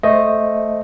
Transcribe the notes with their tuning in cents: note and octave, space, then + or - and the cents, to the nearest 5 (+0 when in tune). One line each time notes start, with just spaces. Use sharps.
A3 +0 C5 +0 D#5 +0